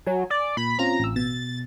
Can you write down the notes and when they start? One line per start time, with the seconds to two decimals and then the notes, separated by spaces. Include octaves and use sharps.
0.07 F#3 G#5
0.30 D5
0.57 A#2 B5
0.79 C4 C#4 F4 A#5
1.00 A1 E6
1.16 B2 A6